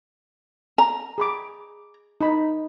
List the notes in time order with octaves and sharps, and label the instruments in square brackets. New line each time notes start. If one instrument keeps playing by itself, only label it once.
[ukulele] A#5
[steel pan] G#4 B5 D6
D#4 B5